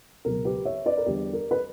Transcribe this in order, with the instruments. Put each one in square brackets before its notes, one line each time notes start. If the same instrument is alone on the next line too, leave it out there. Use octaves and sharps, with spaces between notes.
[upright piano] C#2 B2 F#3 A#4
G4 B4
C#5 E5
B4 D5
A#4
E2 D3 G3 G4
A#4
B4